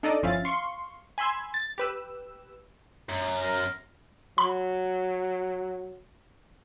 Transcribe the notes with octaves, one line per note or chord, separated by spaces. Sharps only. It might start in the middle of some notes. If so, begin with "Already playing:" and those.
D4 D#4 A4 D5 D#5
G1 F3 C#4 E4 F5 A6
F5 C6 C#6
G#5 B5 C6 E6 G#6
A6
G4 B4 E6
F#2
A#4
F#3 B5